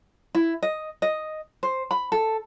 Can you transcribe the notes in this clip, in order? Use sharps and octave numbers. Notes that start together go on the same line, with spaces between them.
E4
D#5
D#5
C5
B5
A4